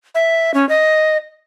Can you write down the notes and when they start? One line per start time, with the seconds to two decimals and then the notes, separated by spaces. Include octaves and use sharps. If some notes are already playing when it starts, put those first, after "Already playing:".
0.15 E5
0.54 C#4
0.69 D#5